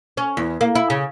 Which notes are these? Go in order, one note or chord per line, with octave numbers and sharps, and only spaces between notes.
C#4
E2
A#3
E4
C#3